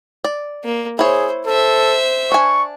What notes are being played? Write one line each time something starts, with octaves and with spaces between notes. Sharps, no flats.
D5
A#3
E4 G#4 C5 C#5
A4 C5 E5
D4 G#5 C#6